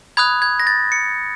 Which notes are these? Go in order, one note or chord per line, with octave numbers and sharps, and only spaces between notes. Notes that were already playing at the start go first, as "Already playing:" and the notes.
B5 D#6 F#6 G#6
G#6
A#6
A6
C#7